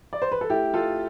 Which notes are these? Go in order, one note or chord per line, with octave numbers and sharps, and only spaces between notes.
D5
C5
B4
A4
A3 E4 G4
F4 A4